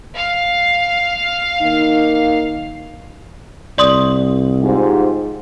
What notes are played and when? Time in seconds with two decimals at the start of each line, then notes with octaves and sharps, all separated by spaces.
0.16 F5
1.62 D#3 A#3 D#4
3.78 C2 D5 C6 D#6
4.62 G#2 F4 G4 C5